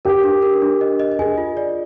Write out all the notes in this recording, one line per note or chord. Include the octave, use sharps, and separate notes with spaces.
G4 A#4
D4
A#4
D4
D#5
D#5
G#4 G#5
F4
D5